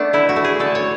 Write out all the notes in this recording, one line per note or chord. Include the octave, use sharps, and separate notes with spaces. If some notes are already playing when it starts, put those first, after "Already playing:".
Already playing: A3 B3 D4
D3 E4
F#4
A3
G#4
D3 A4
C#5